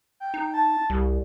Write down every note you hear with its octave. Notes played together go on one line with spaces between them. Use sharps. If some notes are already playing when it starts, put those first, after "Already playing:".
G5
D#4
A5
C2 G3